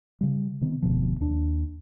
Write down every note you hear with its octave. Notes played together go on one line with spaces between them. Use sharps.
C#3 G3
C3 D#3 B3
F1 D2 B2 F3
D#2 D4